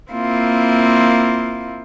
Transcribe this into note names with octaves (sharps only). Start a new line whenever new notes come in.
A#3 C4 E4 F4